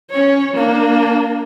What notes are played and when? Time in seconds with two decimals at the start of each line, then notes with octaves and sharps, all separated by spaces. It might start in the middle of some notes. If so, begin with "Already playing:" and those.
0.10 C#4 C#5
0.54 A#3 D4